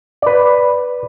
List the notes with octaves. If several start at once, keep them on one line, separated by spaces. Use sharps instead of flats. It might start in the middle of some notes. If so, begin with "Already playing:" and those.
B4 D5